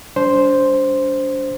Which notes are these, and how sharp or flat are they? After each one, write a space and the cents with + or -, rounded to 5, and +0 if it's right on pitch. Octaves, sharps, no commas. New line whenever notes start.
G3 +0 D4 -35 C5 +0